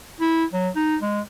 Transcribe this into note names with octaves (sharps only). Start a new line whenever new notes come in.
E4
F#3
D#4
G#3